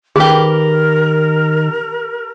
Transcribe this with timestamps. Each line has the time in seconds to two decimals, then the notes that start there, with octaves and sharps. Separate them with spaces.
0.16 D#3 G4 G#4 A#4 B4